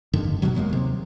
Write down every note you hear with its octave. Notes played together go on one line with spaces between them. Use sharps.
F1 G2 D3 D#3
F#1 D#2 B2 F#3
F#1 F#3 G#3 A#3
D#2 C3